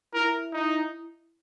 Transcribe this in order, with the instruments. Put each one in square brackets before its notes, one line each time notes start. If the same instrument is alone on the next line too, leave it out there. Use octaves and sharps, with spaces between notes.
[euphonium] E4 [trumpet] A#4
[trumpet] D#4